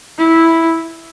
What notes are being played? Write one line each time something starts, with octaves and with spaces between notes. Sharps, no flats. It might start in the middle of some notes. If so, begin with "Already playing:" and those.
E4